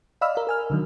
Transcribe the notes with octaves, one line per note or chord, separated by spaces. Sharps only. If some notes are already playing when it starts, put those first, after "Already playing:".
D5 D#5 F5 B5 E6 F6
A#4 F5
A#4 G#5 F6
D3 D#3 F#3